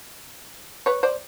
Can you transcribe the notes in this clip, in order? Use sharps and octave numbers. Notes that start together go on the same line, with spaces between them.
B4 C#5
C5 D5